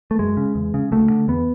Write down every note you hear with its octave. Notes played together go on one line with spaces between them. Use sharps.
A3
F#2 G#3
C#3
E2
C#3
D2 A3
D3
E2 B3